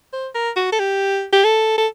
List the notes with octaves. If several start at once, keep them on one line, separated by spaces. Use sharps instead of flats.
C5
A#4
F#4
A4
G4
G4
A4
A4